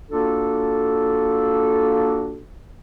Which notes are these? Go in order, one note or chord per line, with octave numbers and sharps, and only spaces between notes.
A#3 D4 F4 F#4 A4